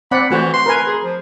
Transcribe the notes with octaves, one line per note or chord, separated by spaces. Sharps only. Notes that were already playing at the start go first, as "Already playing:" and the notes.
C4 D5 F#5 B5
E3 A3 F#4 C5
C6
A#4 B4 G#5
G#4
F3